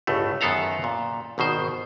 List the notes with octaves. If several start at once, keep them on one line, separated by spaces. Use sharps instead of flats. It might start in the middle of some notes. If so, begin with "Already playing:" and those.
G1 C#2 A2 A3
F#2 D#3 B3 A4 F5 A#5
A#2
G#1 B2 D#3 C5